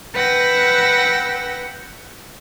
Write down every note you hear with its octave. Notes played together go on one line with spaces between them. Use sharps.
B4 F#5 G5 E6 A#6